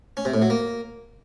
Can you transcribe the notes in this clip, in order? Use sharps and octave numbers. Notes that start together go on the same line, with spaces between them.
C#4
C3
A2
F#3
A#3